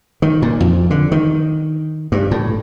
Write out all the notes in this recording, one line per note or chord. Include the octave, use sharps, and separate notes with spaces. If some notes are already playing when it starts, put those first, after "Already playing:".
D#3
A#2
F2
D3
D#3
G2
A2